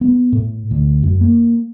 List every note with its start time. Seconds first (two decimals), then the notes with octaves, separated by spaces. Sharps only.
0.01 B3
0.32 A2
0.71 D2
1.03 F#2
1.21 A#3